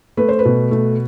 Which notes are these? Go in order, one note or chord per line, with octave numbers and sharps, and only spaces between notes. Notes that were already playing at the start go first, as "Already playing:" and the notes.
A3 B4
C5
B4
B2
A3